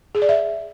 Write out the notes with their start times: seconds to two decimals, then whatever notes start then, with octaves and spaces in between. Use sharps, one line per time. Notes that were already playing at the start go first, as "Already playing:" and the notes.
0.15 G#4
0.22 D5
0.29 E5